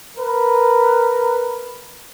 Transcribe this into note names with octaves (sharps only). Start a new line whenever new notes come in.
A#4 B4